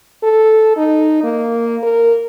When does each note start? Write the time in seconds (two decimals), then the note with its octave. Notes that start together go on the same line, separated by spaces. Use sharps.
0.23 A4
0.77 D#4
1.23 A#3
1.83 A#4